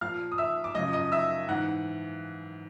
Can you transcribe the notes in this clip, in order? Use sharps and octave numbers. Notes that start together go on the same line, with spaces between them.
A#2 F3 F5 F6
D#6
E5 E6
D6
F#2 C#3 F3 D#5 D#6
D#5 D#6
E5 E6
G#2 E3 F#5 F#6